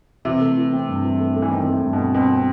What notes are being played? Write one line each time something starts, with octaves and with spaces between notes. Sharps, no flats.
C3 E3
A3
E3
C4
G2
E3
A3
A3
E3
D#3 C4
A2 A3
G2
B2
C4
B2 C4
C4